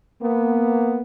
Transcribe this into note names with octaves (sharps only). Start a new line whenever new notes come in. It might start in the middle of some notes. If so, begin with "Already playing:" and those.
A#3 B3